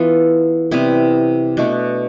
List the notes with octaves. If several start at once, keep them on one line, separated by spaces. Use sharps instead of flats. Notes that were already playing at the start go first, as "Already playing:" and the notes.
Already playing: E3 B3 F4 A4
C3 G3 B3 C4 E4
B2 A3 D4